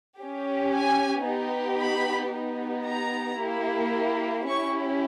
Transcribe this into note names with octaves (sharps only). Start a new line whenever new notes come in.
C#4 G4
G#5
B3 D#4 G4
B5
B3 D#4 G4
A#5
A#3 E4 G4
C#4 E4 G4 C#6